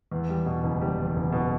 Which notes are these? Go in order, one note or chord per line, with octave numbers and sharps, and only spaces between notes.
E2
G3
B2
F#1
G3
E2
F#1
B2